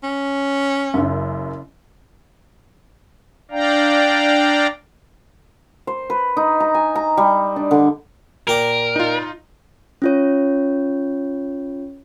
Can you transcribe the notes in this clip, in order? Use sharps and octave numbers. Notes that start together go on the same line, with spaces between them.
C#4
F#1 F#2
D4 D5 F5 G5 A#5
C5
B4
D#4
A#5
G#5
A#5
G3
D4
D3
A#2 A#4 G5 D6
D#4 F4
C#4 F4 C#5